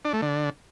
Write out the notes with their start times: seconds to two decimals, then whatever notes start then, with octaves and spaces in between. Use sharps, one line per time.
0.05 D4
0.13 A3
0.22 D3